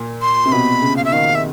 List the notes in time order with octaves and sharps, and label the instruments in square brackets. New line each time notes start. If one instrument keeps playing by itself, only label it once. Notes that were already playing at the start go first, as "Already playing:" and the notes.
Already playing: [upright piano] A#2
[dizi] C6
[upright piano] C3
[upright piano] B2 [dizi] B5
[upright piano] C#3
[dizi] F5
E5
[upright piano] D#3 [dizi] F5
[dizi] E5